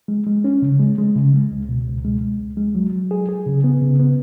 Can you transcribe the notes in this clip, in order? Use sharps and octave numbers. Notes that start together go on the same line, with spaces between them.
G#3
G#3
C#4
C#3
G#3
G#3
C#3
G#3
C#2
B2
C#2
G#3
G#3
C#2
G#3
F#3
F#3
G#4
G#4
C#3
B3
C#3
B3